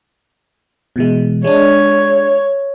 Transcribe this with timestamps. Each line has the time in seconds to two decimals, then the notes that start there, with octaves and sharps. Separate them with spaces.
0.96 B2 E3 G#3
1.44 G#3 D4 C#5